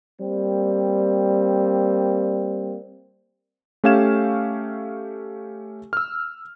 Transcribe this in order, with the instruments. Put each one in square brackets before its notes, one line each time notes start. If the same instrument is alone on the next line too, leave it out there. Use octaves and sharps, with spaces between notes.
[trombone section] G3 A#3 C4
[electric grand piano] A3 C#4 G4 F5 G#6 E7
E6 F6